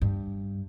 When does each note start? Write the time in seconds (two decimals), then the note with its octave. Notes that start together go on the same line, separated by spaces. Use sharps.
0.02 G2